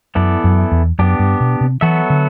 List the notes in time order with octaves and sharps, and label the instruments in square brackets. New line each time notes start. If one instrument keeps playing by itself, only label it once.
[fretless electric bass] F#2 [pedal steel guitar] E3 B3 E4 A4 D5
[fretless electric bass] F#2
E2
[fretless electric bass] F#2 [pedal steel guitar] B3 D4 G4
[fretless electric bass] G2
B2
C3
[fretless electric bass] E3 [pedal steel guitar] F#3 B3 F#4 A4 E5
[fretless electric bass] D3